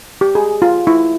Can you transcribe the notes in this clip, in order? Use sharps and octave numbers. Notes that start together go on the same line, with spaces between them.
G4
G#4
F4
E4